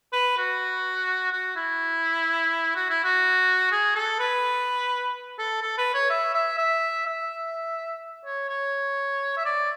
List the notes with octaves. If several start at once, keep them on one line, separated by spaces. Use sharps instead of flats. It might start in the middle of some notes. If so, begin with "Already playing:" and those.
B4
F#4
F#4
E4
F#4
E4
F#4
G#4
A4
B4
A4
A4
B4
C#5
E5
E5
E5
E5
C#5
C#5
E5
D5